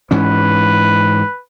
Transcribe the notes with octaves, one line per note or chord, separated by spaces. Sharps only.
G#2 E3 C#4 B4